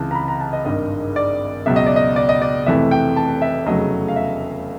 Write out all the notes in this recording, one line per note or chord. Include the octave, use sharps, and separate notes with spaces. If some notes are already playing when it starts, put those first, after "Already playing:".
Already playing: C#2 C3 E3 A5
A#5
B5
A#5
A5
D#5
G#1 G2 D#3 D#5
D5
C#2 B2 F#3 E5
D#5
D5
D#5
D5
D#5
D5
F1 F2 C3 E3 A3 E5
G5
A5
E5
F1 E2 C#3 F#3 A3 D#5
F5
E5